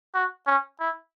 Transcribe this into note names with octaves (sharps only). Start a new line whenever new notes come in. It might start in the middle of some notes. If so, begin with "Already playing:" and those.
F#4
C#4
E4